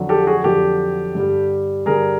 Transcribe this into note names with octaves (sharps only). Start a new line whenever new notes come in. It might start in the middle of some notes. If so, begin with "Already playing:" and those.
Already playing: F2 D3 F#3
G4 A4
F#4 G#4
F2 D3 F#3 G4 A4
G2 D3 G3
G2 D3 G3 G#4 A#4